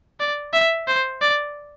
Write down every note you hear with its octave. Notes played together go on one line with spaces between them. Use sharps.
D5
E5
C5
D5